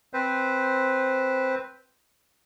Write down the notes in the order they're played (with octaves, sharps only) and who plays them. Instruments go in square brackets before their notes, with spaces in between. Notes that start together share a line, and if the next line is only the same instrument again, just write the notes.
[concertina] C4 B4 C5